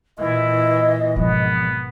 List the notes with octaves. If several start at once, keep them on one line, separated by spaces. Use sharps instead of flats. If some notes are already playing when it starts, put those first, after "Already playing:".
A#2 E3 E4 D#5
G#1 B2 E3 F3 B3